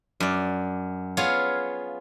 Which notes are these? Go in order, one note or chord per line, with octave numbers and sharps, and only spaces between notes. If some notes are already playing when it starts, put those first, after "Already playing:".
F#2 D5
B3 F4 G#4 C#5 F5